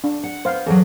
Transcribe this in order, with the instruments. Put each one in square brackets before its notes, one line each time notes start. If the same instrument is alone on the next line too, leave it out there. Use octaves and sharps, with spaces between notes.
[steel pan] D4
[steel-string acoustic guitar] F#5
[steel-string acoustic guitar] B3 [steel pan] C5 F5
[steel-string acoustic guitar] E2 F#3 [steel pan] G#4 A4